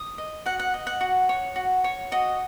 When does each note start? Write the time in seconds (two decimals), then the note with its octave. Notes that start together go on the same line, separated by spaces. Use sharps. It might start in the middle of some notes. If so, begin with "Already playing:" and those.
Already playing: D#6
0.18 D#5
0.46 F#4 F#5
0.59 F#5
0.74 D#5
0.87 F#5
1.01 F#4
1.29 C#5
1.56 F#4
1.84 C#5
2.12 F#4 D#5